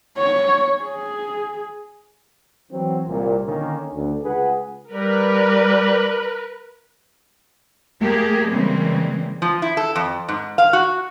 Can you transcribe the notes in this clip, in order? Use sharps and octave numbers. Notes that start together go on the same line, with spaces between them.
C#5
G#4
E3 F#3 C4
C2 A#2
D3 D#3 A#3 C#4
D2
C#2 G#4 B4 F#5
G3 A#4 B4
A3 A#3 G4 G#4
C#3 E3 G3 G#3 A#3 C4
F3
E4
A4
F2
G#2
F5
F#4